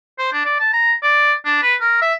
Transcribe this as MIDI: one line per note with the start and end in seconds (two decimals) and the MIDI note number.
0.19 0.31 72
0.33 0.44 62
0.45 0.60 74
0.60 0.70 81
0.73 0.93 82
1.03 1.33 74
1.45 1.58 62
1.63 1.75 71
1.81 2.00 70
2.02 2.14 76